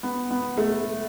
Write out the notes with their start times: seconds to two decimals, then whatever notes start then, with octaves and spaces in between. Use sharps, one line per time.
0.03 B3
0.30 B3
0.57 A3